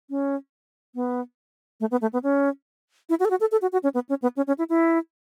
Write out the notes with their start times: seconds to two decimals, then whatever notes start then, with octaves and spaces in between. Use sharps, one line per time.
0.10 C#4
0.95 B3
1.80 A3
1.91 B3
2.01 A3
2.13 B3
2.23 C#4
3.09 E4
3.20 F#4
3.25 A4
3.30 F#4
3.40 A4
3.52 A4
3.62 F#4
3.72 F#4
3.83 C#4
3.94 B3
4.09 C#4
4.22 B3
4.37 C#4
4.47 C#4
4.58 E4
4.69 E4